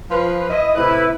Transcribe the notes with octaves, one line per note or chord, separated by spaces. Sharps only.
F3 F4 B4
E4 D#5
A2 C3 E4 B4